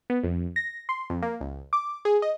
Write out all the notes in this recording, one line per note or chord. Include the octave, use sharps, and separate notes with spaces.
B3
F2
A#6
C6
F2
A#3
C#2
D6
G#4
D#5